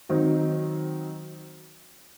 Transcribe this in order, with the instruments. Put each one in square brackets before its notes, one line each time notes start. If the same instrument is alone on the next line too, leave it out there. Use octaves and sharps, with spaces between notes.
[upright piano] D#3 F#3 C4 D#4